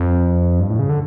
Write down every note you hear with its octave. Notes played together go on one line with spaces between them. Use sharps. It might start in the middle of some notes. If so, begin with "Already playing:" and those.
Already playing: F2
G2
A2
C#3
D3